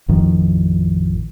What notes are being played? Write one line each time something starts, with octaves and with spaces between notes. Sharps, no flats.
A1 F2 D#3 F3